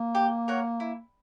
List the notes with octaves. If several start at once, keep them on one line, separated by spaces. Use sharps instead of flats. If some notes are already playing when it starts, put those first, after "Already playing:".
Already playing: A#3
G4
A#4 C#5 F#5
E4